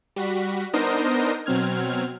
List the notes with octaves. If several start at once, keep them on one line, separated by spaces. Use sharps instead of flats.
G3 F#4 B6
B3 D4 D#4 A#4 C5 D#5
B2 F#3 C4 F6 G#6